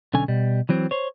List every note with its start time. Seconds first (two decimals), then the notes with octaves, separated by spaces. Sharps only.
0.14 B1 D3 C#4 G#5
0.28 B2 G3
0.69 E3 F#3 C4
0.91 C5 C#5